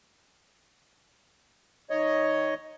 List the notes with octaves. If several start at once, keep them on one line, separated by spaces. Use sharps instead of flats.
D#3 C#5 D#5